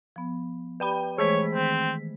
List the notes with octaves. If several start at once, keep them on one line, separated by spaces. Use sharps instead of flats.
F3 B3
G4 B4 D5 G5 B5
E3 G#3 A3 G#4 C5 C#5 B6
D#3 C4